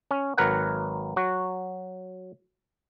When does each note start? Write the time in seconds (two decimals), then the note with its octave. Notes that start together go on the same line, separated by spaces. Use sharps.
0.11 C#4
0.38 G#1 F#3 A#4 B4 F#5
1.16 F#3 F#4